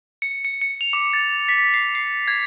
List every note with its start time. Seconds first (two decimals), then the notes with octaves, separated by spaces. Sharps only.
0.22 C#7
0.45 C#7
0.61 C#7
0.81 F7
0.93 D6
1.13 A6
1.49 B6
1.74 C7
1.95 C7
2.28 G#6